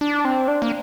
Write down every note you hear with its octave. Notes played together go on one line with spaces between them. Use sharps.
D4
C4
D4
A#3